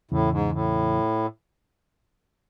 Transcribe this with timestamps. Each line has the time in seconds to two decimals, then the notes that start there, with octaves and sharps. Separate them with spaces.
0.11 E2 A2 C#3 E3
0.32 G#2
0.52 A2